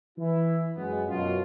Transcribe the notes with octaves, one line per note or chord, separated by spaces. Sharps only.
E3 E4
F#2 G#3 B3
F#2 B2 F4